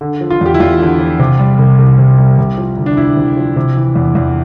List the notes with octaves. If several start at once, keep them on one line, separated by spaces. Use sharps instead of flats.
D3
F3
F4
E2 G4
E4
E2 F4
D3
F3
C3
G3
C2
C2
C3
G3
C3
F3
D2
D4
D2 E4
C3
F3
C3
E3
E2
E2